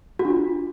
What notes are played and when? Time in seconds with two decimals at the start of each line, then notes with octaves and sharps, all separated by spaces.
0.19 F#4
0.25 D4
0.30 F4